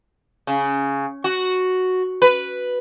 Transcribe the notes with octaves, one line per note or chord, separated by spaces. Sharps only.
C#3
F#4
B4